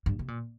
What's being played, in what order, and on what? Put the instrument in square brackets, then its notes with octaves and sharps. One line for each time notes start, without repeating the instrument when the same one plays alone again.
[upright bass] G2
C3
A#2